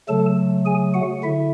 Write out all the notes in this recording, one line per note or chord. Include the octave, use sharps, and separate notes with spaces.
C#3 F#3 A3 A4 A5
G#4 G#5
F#4 F#5
D3 E4 E5